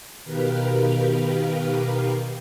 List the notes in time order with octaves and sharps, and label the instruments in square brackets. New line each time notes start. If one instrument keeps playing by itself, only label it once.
[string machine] B2 D#3 G4 A#4 B4 F5